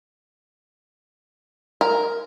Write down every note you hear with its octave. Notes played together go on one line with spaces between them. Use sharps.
A#4